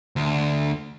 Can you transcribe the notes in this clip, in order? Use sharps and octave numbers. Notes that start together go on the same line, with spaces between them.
D2